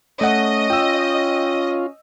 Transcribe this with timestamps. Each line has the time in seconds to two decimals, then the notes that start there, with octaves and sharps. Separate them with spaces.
0.21 A3 C#4 D#5 F#5
0.70 F4 G5 E6